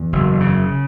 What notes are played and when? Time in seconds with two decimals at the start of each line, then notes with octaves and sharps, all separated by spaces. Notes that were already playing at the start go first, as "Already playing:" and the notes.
Already playing: E2
0.13 F#1
0.40 C#3